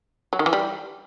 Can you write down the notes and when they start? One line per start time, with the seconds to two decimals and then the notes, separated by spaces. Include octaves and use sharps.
0.33 F#3
0.39 D#3
0.46 E3
0.53 G3